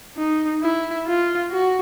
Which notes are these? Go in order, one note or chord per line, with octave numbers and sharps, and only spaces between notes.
D#4
E4
F4
F#4